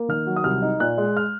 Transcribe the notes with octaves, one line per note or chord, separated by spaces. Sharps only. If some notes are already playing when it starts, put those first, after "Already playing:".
Already playing: A#3
D#3 F6
F#3
D#6
C2 F6
D#4
A#2 F#6
G#3
F6